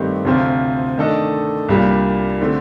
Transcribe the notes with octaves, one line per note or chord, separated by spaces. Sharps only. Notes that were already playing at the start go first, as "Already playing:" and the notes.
Already playing: G2 D#3 A3 C4 G4
D2 C3 F3 C4 F4
D#3 A3 D4 A4 D#5
C2 A#2 G3 A#3 D4
D3 A3 C4